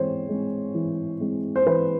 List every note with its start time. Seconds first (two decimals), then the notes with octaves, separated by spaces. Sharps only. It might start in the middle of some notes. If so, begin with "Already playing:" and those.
Already playing: E3 G#3 C4 C5 C#5
0.29 G#3 C4
0.74 E3
1.20 G#3 C4
1.56 C5
1.66 E3 B4